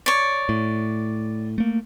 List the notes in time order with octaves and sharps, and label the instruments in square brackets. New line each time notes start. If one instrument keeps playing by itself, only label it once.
[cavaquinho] C#5 D5
[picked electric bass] A2
A3 A#3